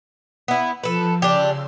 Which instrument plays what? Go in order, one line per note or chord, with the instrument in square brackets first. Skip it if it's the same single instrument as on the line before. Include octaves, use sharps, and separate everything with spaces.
[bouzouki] B3 E4
[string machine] F3 [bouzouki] A4 B4
[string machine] C#3 C6 E6 [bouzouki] D4 G4